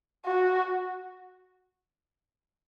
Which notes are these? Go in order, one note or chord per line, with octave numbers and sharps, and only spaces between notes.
F#4